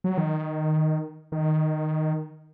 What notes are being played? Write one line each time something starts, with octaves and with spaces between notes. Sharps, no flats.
F#3
D#3
D#3